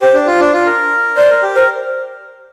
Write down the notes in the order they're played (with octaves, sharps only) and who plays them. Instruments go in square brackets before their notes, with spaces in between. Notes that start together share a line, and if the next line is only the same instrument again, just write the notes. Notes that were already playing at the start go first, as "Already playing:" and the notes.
[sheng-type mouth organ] G4 [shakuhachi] C5
[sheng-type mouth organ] D4
F4
D4
F4
A#4
[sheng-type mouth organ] C5 [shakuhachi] D5
[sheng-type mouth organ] A#4
G4
[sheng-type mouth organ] A#4 [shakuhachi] C5